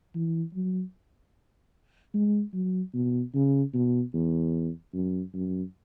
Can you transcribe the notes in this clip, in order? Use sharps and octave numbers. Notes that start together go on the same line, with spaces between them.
E3
F#3
G#3
F#3
B2
C#3
B2
E2
F#2
F#2